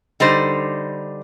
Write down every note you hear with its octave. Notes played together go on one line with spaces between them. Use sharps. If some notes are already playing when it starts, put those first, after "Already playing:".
D3 G3 D#4 C5